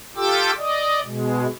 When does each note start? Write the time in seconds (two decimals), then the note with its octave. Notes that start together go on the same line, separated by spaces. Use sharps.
0.16 F4 G4 A4 G5 D6 E6
0.58 D5 D#5
1.04 B2 G#3